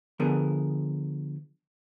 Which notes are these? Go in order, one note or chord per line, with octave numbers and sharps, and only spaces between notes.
D3 F3 B3 G#4 A#4